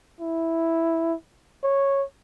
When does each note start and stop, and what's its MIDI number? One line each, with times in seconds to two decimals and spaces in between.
0.21 1.15 64
1.64 2.04 73